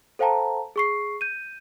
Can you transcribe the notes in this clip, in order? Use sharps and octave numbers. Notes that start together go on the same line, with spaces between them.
A4 C5 F5 G5 A5 A#5
G#4 C#6 C7
G6 D#7